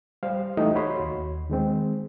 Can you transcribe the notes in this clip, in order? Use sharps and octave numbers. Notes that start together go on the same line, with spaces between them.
G3 C5 F5
E3 A3 D#4 F#4 G4 D#5
F#4 C#5 B5 C6
D#2
D#3 G#3 C4